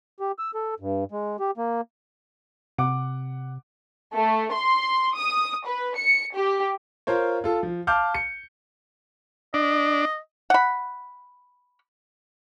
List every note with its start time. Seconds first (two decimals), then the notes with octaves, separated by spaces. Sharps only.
0.20 G4
0.39 E6
0.55 A4
0.80 G2
1.12 G#3
1.40 G4
1.58 A#3
2.78 C3 F#5 D6
4.14 A3
4.54 C6
5.16 D#6
5.67 B4
5.97 C#7
6.35 G4
7.07 F4 A#4 C5 C#5
7.44 F4 A4
7.63 F3
7.87 F5 A5 D6 F6 G6
8.15 C#7
9.54 D4 D#5
10.50 F#5 B5